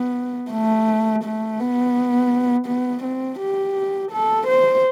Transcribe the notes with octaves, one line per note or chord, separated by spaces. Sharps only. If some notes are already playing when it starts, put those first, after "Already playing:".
Already playing: B3
A3
A3
B3
B3
C4
G4
A4
C5